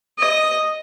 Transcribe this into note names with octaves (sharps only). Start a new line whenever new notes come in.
D#5